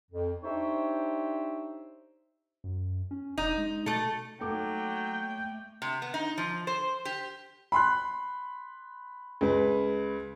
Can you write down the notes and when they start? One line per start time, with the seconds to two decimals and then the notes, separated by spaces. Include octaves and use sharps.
0.11 F2
0.44 D4 D#4 G4 C5 C#5 E5
2.64 F#2
3.11 C#4
3.38 E1 D#4
3.58 G#3
3.86 B2 A3 A4
4.41 F#3 A3 A#3 D#4 A4 G5 D6
5.82 C3
6.02 B3
6.14 D#4
6.38 F3
6.67 C5
7.05 G4
7.72 B5 C6 F#6
9.41 C#2 B4